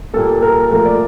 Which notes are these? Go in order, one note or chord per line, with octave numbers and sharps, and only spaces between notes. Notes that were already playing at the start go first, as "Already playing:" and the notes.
A#2 G3 A#3 A4
A#4
A#2 F3 A3 A#4
D5